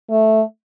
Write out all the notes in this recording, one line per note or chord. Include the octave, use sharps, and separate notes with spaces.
A3